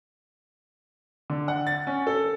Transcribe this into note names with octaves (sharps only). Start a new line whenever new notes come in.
D3
F#5
A6
C#4
A4